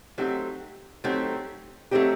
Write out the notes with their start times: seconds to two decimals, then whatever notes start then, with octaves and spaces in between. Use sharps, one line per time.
0.18 F#3 A3 C4 D#4 G4
1.04 F#3 A3 C4 D#4 G4
1.91 F#3 A3 C4 D#4 G4